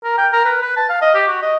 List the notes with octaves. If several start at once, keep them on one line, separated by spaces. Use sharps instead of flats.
A#4
G5
A#4
B4
B4
A5
F5
D#5
G4
F#4
D#5